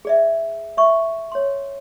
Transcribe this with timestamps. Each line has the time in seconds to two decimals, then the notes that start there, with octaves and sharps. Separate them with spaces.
0.05 G#4 D5 E5
0.77 E5 C#6
1.32 C#5 C6